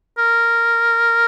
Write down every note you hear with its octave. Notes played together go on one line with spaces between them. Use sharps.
A#4